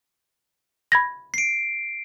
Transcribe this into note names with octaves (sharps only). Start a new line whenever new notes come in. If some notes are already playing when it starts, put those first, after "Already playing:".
B5 G#6 A#6
C7 D7